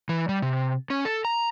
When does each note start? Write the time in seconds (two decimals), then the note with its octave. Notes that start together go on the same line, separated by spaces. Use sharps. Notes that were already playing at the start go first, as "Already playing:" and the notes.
0.09 E3
0.29 G3
0.42 C3
0.90 C#4
1.05 A4
1.25 A#5